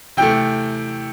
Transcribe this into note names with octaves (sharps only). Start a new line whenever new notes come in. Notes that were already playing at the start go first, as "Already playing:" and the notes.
C3 E3 A3 G5